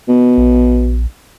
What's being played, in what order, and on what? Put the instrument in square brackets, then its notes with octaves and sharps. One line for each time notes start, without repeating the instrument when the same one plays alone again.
[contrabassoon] B2
[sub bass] A#1